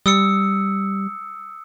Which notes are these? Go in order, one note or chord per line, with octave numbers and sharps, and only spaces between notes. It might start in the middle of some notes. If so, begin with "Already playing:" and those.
G3 D#6 E6 C#7